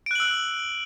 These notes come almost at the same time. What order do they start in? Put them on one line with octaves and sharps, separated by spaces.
D7 F#6 F#7 E6